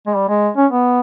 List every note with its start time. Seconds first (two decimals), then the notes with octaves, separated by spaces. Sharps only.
0.07 G#3
0.15 G3
0.29 G#3
0.56 C#4
0.72 B3